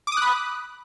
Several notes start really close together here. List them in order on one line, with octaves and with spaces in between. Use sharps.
D6 D#6 F#6 B5